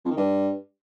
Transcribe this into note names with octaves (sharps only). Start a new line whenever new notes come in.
F2
D#3
G2